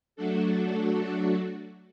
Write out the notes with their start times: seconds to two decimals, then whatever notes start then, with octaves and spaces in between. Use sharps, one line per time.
0.16 F#3 A3 D4 F#4 A4